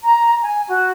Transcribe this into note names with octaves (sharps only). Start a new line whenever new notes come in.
A#5
G#5
F#4